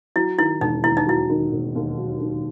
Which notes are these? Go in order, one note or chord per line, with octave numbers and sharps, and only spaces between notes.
F#3 E4
D#3 E4
E1 D#4
D#2 E4
D#4
F#3 E4
D#3
E1
D#2
F#3
D#3